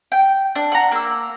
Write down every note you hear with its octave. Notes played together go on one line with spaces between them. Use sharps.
G5
D4
F#5 A#5
A#3 E6